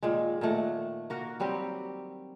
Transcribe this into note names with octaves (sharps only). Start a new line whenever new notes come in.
A#2 D#3 G#3
A#2 D#3 A3 F#5
A#3 F#4 A#4
F#3 G3 C4 G4